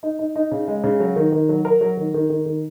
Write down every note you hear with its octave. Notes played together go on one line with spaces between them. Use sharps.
D#4
D#4
D#4
C#3
G#3
C#3
F#3
D#3
D#3
F#3
A#4
F#3
D#3
D#3
D#3
D#3